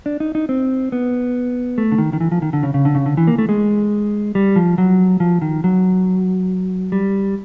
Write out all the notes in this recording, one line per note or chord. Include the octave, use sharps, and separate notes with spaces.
D4
D#4
D#4
C4
B3
A3
D3
D#3
D#3
E3
F3
D#3
D3
C#3
C#3
D3
C#3
D3
E3
A#3
A3
G#3
G3
F3
F#3
F3
D#3
F#3
G3